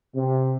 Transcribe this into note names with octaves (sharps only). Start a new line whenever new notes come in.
C3